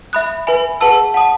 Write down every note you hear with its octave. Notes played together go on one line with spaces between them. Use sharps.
E5 B5 D#6 F#6
B4 E5 G#5 B5
G#4 B4 F#5 A5 E6
F#5 A5 D#6